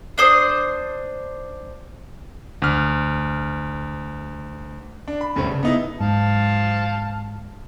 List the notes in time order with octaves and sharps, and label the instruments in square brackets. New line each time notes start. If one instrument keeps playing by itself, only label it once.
[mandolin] D4 C5 D#6
[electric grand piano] D2 F6
[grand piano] D4
B5
D2 G2 C3 A3 C4 C#4
C#3
B3 D#4 E4
[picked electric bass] G#2 [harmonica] F5 A5